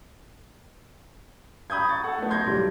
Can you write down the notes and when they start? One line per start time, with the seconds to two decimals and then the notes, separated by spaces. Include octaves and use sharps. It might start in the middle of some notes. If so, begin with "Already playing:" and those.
1.70 A#5 B5 D#6 G6 G#6
1.89 C#6 A6
2.03 A4 F#5
2.18 A3 B3
2.30 C6 G6 G#6 A#6
2.46 B1 G3